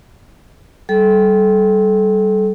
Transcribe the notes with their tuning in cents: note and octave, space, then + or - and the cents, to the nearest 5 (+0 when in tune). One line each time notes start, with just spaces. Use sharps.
G3 -20 A4 -30